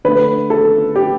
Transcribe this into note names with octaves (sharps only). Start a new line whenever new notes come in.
D3 A3 B4
A4
G4